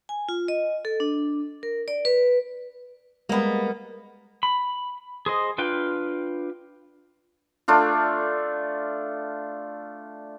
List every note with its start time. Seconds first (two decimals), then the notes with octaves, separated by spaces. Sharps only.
0.09 G#5
0.29 F4
0.48 D#5
0.85 A4
1.00 D4
1.63 A#4
1.88 D5
2.05 B4
3.29 G3 G#3 A#3 B3
4.43 B5
5.26 G#4 C5 D#5
5.58 D4 F4 B4 G5
7.68 A3 D4 F4